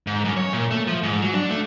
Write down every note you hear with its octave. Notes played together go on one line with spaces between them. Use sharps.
G#2
F#2
C#5
A#2
A3
F3
G#2
F#3
D4
A3